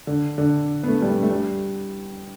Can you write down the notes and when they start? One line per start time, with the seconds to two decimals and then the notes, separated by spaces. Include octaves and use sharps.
0.07 D3
0.38 D3
0.83 B3
0.88 A3
1.02 G3
1.09 A3
1.23 A3
1.30 G3